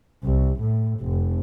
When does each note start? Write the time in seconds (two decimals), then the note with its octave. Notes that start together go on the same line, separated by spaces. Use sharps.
0.23 C2
0.60 A2
1.00 F1